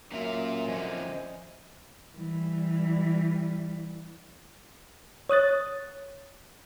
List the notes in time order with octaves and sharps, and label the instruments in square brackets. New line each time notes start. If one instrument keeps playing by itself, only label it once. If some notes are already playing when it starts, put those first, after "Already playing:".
[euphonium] F#2 [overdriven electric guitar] A#2 F4 [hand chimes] C#4 E5
[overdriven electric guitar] F2 D3 [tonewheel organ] C5 D#5 G#5
[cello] E3 G3
[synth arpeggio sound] C#5 D#6 F#6 A6